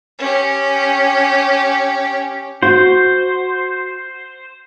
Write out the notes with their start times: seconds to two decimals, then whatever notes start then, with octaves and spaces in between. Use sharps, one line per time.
0.19 C#4 G4
2.63 F#4 C5